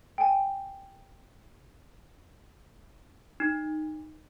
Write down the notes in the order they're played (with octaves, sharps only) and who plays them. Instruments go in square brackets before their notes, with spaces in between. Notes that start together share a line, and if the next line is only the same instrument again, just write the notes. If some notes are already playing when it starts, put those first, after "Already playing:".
[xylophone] G5 G#5
[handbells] D#4